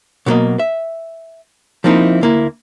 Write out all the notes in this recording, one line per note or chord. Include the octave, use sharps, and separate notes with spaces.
B2 D3 F#3 A#3 D#5
E5
F3 A#3 C4 D#4 E4
D2 A#3 E4